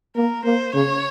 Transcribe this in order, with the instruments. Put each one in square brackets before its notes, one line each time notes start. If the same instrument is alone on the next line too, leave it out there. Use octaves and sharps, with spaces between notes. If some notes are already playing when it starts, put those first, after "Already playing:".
[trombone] A#3 [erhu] A#4
[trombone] A#3 [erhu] C5
[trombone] C#3 [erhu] C#5